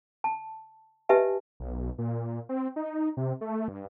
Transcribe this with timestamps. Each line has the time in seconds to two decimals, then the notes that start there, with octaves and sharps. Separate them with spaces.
0.24 A5
1.09 G4 B4 D#5 E5 G#5 A5
1.60 B1
1.98 A#2
2.49 C4
2.76 D#4
3.17 C3
3.41 A3
3.68 G2